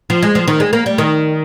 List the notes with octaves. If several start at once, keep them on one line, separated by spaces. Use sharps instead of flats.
F3
G#3
F3
D#3
G#3
A#3
G3
D#3